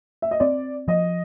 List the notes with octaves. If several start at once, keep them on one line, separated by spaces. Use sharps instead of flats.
E5
D#5
C4 D5
F3 D#5